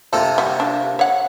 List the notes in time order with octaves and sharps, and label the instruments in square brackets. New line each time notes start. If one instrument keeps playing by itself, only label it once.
[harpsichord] C3 A#3 F4 [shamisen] D4 A4
[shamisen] G3 F#4
D4
C#5 F#5